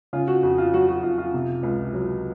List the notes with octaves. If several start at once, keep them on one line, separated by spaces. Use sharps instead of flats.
C#3 F4
F#4
F2 F#4
F4
F#3 F#4
F#4
F2 F4
F4
C3
C#2
F#3